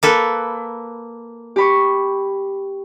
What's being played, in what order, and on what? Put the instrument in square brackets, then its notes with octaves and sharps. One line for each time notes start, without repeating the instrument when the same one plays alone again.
[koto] A#3 A4 B4
[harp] G4 B5 C#6